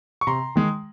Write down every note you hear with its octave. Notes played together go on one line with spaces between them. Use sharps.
C#6
C3 A#5 C6
D#3 G#3